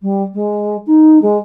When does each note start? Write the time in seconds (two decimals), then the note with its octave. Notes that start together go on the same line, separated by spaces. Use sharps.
0.01 G3
0.34 G#3
0.86 D#4
1.21 G#3